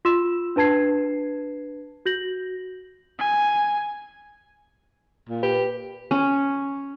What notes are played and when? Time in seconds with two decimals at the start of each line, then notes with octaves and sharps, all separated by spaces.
0.05 F4 C6 E6 E7
0.56 D4 B4 A5 G#6 C7
2.06 F#4 G6 A#6 F#7
3.19 G#5
5.29 A#2
5.43 G4 B4
6.11 C#4